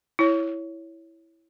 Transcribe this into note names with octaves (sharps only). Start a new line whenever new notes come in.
E4 C#5